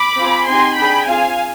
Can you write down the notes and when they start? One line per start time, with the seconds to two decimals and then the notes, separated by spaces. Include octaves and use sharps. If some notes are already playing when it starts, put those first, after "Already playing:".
Already playing: B5 D6
0.17 C4 F4 G#4
0.47 C4 D#4 G4 G#5 C6
0.76 D4 G5 B5
0.82 G#4
1.06 C4 F4 G#4 F5 G#5